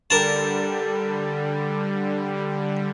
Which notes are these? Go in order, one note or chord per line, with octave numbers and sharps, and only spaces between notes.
D3 G3 A4 A#4 A5